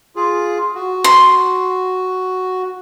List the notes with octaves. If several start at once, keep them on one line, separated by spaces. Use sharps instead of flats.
F4 G#4
F#4
C6